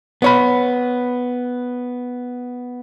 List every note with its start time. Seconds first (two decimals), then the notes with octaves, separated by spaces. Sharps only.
0.22 B3 C#5 B5